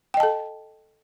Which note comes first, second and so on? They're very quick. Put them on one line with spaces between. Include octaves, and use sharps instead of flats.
G5 D#5 A5 A4